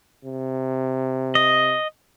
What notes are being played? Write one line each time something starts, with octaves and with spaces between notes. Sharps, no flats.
C3
D#5